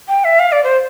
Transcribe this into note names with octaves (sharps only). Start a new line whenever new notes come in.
G5
E5
F5
D5
C5